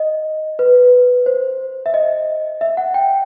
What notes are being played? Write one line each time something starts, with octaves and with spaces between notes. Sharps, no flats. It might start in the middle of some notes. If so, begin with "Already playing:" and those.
Already playing: D#5
B4
C5
E5
D#5
E5
F#5
G5